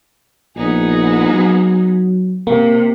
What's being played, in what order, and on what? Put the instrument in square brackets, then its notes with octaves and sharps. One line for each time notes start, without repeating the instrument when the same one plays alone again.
[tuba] A#1 [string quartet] B3 D#4 G#4
[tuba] F#3
[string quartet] C3 [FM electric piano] A#3